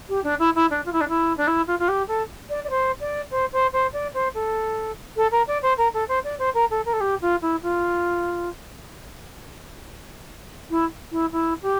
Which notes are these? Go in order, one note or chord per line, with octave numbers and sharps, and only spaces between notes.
G4
D4
E4
E4
D4
F4
E4
D4
E4
D4
E4
F4
F4
G4
A4
D5
D5
C5
D5
C5
C5
C5
D5
C5
A4
A4
A#4
D5
C5
A#4
A4
C5
D5
C5
A#4
A4
A#4
A4
G4
F4
E4
F4
E4
E4
E4
G4